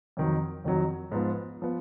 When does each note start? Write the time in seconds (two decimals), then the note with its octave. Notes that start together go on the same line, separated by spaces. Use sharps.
0.17 F2 D#3 F#3
0.64 F2 D#3 F#3
1.12 G#2 F3 B3
1.62 F3 B3